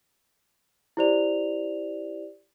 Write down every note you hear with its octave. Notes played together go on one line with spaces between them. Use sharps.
E4 G4 C5 D5 F7